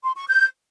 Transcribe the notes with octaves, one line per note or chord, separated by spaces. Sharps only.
C6
C#6
G6